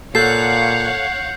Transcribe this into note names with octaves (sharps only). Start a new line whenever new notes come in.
A#2 A4 C#5 F5 F#5 G6 C7